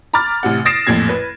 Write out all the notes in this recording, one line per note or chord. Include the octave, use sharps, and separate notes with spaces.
A#5 B5 D6 F6 A6
A1 C3 F#5
D#6 A6 A#6 C7 D7 E7
A1 F2 A#2 G#6
B4